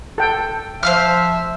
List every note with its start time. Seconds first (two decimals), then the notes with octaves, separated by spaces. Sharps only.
0.18 A4 G5
0.83 F3 C5 E5 F5 F6